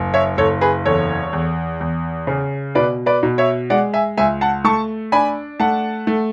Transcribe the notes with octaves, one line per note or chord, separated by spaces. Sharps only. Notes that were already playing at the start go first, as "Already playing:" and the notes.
Already playing: F#1
C#5 E5
F#1 A4 C#5
G#4 B4
E2 A4 C#5
E2
E2
C#3
B2 B4 D5
B4 D5
B2
C#5 E5
G#3 D5 F#5
E5 G#5
C#2 E5 G#5
F#5 A5
A3 A5 C#6
D4 G#5 B5
A3 F#5 A5
A3